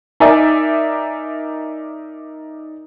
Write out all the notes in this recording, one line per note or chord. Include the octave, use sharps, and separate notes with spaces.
D#4 A#4 D5 E5 G#5 D6